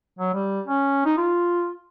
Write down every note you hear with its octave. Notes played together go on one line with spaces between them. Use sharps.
F#3
G3
C#4
D#4
F4